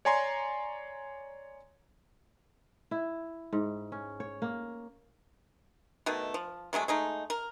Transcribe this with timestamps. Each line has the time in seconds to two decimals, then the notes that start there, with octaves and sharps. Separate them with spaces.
0.05 C#5 D5 G#5 A#5 C6
2.91 E4
3.53 G#2
3.92 C#4
4.20 C#5
4.42 A#3
6.06 B2 D#3 A3
6.34 F3
6.73 C3 F#3 G#3 A3
6.88 G#3 A3 D#4
7.30 A#4